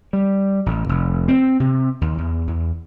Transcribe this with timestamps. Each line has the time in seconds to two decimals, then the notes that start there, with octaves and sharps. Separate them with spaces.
0.13 G3
0.66 A1
0.89 F1
1.28 C4
1.60 C3
2.01 D#2
2.18 E2
2.47 E2